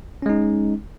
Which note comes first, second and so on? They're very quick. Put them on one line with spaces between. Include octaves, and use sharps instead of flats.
C#4 G#3 D#4